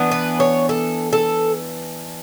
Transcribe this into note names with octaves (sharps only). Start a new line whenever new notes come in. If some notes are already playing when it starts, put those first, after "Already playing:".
Already playing: E3 B3 D4
B4
C#5
A4
A4